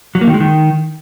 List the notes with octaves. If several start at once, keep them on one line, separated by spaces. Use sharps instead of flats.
F#3
A#3
D#3
G#3
D#3